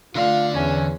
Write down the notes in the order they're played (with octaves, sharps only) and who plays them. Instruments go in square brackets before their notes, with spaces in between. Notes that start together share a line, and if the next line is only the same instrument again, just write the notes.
[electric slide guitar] D3 D5 [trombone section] A3 F4 [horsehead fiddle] F5
[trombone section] E2 [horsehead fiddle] C#4